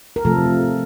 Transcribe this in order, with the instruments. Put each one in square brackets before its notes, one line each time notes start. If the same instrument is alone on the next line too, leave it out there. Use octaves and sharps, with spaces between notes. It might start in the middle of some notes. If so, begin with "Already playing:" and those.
[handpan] A#4
C3 F3 A3 A4